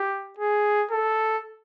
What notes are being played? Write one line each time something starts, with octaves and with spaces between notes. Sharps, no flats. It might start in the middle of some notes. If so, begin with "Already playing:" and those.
Already playing: G4
G#4
A4